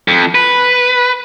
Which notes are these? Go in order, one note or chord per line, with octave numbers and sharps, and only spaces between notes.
F2
B4